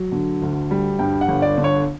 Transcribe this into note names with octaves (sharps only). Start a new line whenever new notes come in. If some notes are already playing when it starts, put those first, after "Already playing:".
Already playing: F#3
D3
D2
G3
G2 G5
F#5
G1
D5
D3
C#5